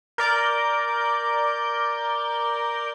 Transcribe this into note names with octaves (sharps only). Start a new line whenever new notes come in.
A#4 D5 G6